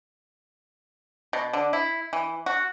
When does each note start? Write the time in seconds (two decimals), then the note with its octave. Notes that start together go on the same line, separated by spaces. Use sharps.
1.33 B2
1.53 D3
1.73 E4
2.13 E3
2.46 F#4